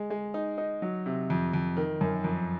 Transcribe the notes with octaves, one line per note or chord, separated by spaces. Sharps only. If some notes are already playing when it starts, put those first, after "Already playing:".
Already playing: G#3
G#3
D#4
D#4
F#3
C3
F2
F2
D#3
F#2
F2